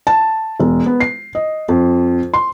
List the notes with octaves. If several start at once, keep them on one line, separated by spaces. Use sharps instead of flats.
A5
E1
B3
C7
D#5
F2
C6